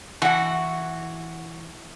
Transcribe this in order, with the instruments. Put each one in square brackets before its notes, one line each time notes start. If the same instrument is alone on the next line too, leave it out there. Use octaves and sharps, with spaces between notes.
[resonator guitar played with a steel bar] E3 F#5 [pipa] F#4